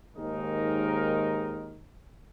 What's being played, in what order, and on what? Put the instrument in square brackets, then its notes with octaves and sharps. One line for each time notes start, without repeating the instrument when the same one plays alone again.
[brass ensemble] D#2 G#2 D#3 G#3 D#4 A#4